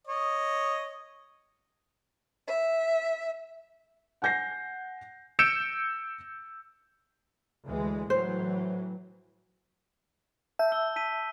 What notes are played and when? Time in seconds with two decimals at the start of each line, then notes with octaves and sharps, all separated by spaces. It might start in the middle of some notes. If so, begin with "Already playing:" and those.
0.07 C#5 D#5
2.47 E5
4.22 F#5 G#5 G6 A#6 C7
5.39 E6 G6 C#7 D7 E7
7.66 D2 E3 G#3
8.10 A2 E3 F#3 C5
10.59 E5 A5 G6
10.72 E6 G7
10.96 A5 B6 D#7